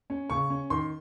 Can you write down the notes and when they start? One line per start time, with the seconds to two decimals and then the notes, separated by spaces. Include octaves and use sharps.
0.10 C#4
0.30 C#3 C#6
0.50 C#4
0.70 D#3 C6